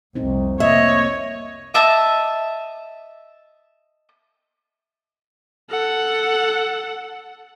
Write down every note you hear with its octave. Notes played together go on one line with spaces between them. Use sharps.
F1 C2 C4 D#4
C3 A#3 C#5 D#5 E5
D#5 E5 A5 D#6
A4 F#5